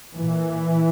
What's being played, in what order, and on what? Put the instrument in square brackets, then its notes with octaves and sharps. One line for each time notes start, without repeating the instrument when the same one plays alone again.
[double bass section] A#2 E3